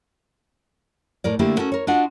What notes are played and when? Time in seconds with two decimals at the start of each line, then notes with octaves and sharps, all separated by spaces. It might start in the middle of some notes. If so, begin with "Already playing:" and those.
1.24 A2 A#4 D5
1.39 D3 A3 A#3 E4 G4
1.57 C#4 F#4 A4 A#4
1.72 A#4 C#5
1.87 D4 F4 F#4 D#5 F#5